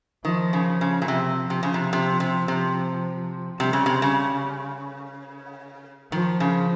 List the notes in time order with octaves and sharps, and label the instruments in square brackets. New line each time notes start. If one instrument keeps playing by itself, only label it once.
[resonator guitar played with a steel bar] D#3 [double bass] F3
[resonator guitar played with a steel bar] C#3
C#3
A#2
[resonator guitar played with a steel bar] C3 [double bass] F3
[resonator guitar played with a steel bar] C3
C#3
C3
C3
C3
C3
[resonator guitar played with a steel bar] C3 [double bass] G3
[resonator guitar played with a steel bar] C#3
C3
[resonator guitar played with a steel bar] C#3 [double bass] G3
[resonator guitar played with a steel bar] D#3 [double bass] F3
[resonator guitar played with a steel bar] C#3